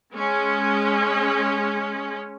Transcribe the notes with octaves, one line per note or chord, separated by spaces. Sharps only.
G#3 C#4